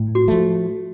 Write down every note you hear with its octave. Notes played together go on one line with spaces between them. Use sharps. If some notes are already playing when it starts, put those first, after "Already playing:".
Already playing: A2
F#4
F3 A3